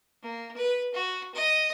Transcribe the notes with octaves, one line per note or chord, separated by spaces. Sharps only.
A#3
B4
F#4
D#5